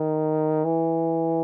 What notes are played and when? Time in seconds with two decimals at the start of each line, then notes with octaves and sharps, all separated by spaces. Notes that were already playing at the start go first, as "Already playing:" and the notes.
Already playing: D#3
0.65 E3